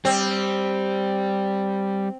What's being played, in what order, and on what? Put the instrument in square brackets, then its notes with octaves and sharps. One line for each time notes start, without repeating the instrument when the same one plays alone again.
[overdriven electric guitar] G3 [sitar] C4